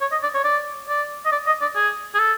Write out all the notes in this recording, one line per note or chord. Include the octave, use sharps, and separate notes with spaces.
C#5
D#5
D5
C#5
D5
D5
D#5
D5
D#5
D5
G#4
G#4
A4